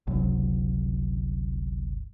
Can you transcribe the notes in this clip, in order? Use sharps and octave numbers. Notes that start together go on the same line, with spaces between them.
G1 C#2 C3 F#3